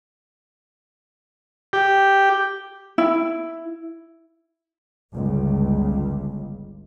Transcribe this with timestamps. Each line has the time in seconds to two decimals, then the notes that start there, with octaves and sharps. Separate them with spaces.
1.73 G4
2.98 E4
5.13 G1 C#2